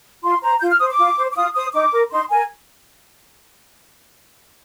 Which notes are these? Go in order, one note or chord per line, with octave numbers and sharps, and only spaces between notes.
F4 C6
C5 A#5
F4 G6
F6
C5 D#6
D6
F4
C5
D6
F4 D#6
C5 D#6
D#4 D6
A#4
D#4 C6
A#4 G#5